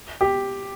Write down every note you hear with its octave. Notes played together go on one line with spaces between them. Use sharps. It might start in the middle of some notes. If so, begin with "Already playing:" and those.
G4